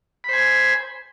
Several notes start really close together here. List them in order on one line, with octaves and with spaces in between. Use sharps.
B5 C5 G#5